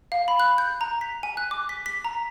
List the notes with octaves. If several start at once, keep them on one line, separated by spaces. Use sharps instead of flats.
F5
B5
F#6
G6
A#5
B6
G#5
F#6
D6
B6
B6
A#5